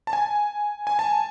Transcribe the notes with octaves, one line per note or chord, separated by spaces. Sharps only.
A5
G#5
G#5
A5